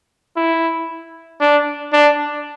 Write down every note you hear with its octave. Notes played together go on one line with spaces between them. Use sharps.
E4
D4
D4